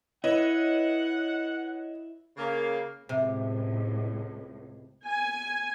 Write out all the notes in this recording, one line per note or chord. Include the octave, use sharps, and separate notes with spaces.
E4 B4 C#5 D#5 F#5
C#3 A#3
C#2 A2 C3
G#5